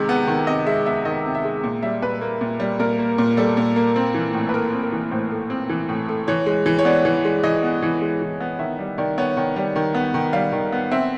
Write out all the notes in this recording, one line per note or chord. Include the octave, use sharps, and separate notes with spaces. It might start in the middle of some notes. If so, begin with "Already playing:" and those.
Already playing: C3 D#3 G#3
B3
D#3
C3 D#5
G#3 E5
B3 E5
D#3 D#5
C3
E5
G#3
A#2
G3 E5
A#2 B4
A#3
A#2
G3
A#2 A#4
A#3
A#2
G3 A4
A#2
A#3
C4
E3
A2
B4
A3 A#4
C4
A#4
E3
A2 C5
A3
C4
E3
A2
A3
E3 C#5
G#3
E3
C#5
B3 D5
E3
G#3
E3 D#5
B3
E3
G#3
E3
B3
D#3 E5
G3
D#3 D5
B3 C#5
D#3
G3
D#3
B3
D#3
G3 F5
D#3
B3
C4 E5